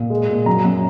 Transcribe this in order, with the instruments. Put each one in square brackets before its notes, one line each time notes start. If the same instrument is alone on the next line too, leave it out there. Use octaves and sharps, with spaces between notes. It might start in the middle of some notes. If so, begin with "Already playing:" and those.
Already playing: [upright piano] A#2
G#3
A#2
F#2 A#5
F#2